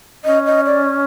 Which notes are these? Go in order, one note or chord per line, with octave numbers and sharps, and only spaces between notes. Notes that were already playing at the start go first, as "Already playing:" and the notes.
C#4 D#5
D#5
D5